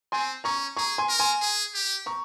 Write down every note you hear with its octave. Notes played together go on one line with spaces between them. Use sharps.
C4 G#5 C6
C#4 A#5 C#6
G#4 A#5 C#6
G#5 C6
A#4
G#5 C6
G#4
G4
A#5 C#6